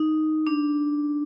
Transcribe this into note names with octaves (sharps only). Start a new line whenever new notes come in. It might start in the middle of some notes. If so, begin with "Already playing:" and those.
Already playing: D#4
D4